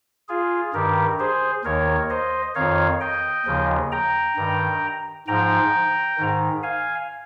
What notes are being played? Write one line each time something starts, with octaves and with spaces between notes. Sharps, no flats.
F4 G#4
G2 D#3 G4 A#4
G#4 C5
D#2 D#3 A#4 C#5
C5 D#5
F2 D#3 C#5 F5
D#5 G5
D#2 C#3 F3
G5 A#5
G2 D#3
G#2 F3 G5 A#5
G#2 D#3
F5 G#5